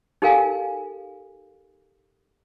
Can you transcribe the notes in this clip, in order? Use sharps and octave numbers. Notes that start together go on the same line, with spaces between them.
D#4 G4 A4 A#4 F5 G#5